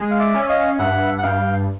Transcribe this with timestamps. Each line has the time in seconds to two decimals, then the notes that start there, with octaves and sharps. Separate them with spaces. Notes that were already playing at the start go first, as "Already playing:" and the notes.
Already playing: G#3
0.11 F5
0.19 D5 E5
0.34 C#4
0.49 D#5 F5
0.79 G2 E5 F#5
1.18 F#5
1.23 G2 F5 G5